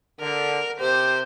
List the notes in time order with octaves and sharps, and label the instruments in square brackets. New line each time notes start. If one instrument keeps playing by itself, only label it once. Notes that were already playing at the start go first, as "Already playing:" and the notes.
[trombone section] D3 [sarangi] A#4
[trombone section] C3 G4 [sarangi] C5